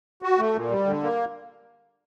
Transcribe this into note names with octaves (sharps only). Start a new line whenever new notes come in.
F#4
A3
A#2
G3
D3
A#3